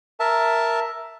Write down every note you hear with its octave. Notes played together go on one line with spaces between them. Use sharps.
A#4 E5 A5